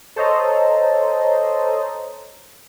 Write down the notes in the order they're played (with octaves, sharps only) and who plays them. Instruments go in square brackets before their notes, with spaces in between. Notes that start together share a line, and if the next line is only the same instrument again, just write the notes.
[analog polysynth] A4 C5 C#5 D#5 A#5